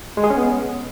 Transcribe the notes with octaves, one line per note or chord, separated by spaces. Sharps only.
G#3
G#4
C#4
B3